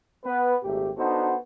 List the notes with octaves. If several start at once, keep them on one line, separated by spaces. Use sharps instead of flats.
B3 B4
G#1 A#2 A3 G4
B3 D4 D#4 F#4 A4 C5